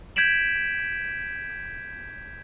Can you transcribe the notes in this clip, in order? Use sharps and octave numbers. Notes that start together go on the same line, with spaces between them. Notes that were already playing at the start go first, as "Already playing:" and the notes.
G6 G#6 B6 D7 E7 F#7